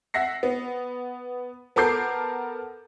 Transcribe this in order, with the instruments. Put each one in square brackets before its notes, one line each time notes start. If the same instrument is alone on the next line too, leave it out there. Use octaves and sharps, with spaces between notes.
[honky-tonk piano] E5 F#5 A#6 C7
B3
B3 A4 A#4 D6 G6 C7